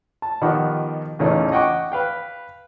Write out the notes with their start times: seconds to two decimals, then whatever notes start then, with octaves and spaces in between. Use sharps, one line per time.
0.22 A5
0.41 B2 D#3 F3 G4 F#5
1.19 E2 A#2 C#3 A3 C#4 D#4
1.52 D#5 F#5 G5 C#6 D6
1.92 B4 F5 G5